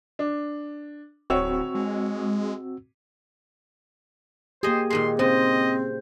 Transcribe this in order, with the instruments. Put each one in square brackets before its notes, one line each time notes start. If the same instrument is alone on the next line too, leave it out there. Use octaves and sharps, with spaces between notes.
[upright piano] D4
[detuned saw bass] D1 [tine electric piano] C4 F#4 E6 [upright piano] C#5
[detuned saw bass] G#3
[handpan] A#3 G4 [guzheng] G#4 D#5 [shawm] C5
[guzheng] A#2 D#3 G#3 [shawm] C6
[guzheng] C#3 [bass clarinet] C4 [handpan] C5 [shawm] D#5